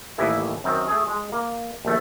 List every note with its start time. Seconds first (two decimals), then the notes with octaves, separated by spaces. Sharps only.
0.18 A1 D#2 E3 G3 E4 D#5
0.64 F#2 D#3 C4
0.87 A3 G#4
1.07 G#3
1.32 A#3
1.85 A#1 D#2 A3